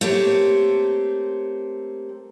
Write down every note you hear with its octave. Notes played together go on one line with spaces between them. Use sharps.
A3 A#3 C4 G4 C#5